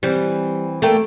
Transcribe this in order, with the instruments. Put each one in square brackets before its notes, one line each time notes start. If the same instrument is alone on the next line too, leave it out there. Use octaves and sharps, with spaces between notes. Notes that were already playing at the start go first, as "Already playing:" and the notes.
[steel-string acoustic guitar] E3 C4 [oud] G3
[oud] A3 [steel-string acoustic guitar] A#3 D5 G5